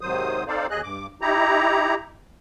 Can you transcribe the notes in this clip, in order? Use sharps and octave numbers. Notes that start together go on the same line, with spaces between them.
G#2 C3 D#3 F#3 C5 D#6
C4 D#4 A4 C5 D5 F5
D#2 G#4 D#5 F#6
G2 D6
D#4 E4 G4 A#5